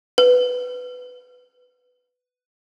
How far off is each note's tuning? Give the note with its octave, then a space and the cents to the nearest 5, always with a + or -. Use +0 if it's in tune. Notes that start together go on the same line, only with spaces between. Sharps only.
B4 +10